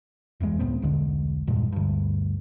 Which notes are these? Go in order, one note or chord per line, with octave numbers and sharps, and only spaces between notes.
F1 E2 A2 G#3
C#2 A2 B3 C4
E1 C2 D3 G#3
E1 G2 A#2 G#3
D2 G2